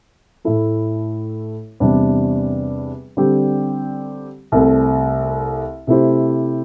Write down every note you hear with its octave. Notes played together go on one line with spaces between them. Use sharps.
A2 A3 E4 A4
E2 C3 G3 D4
D3 G3 C4 G4
C2 C3 A3 C4 A4
C3 A3 E4 G4 C5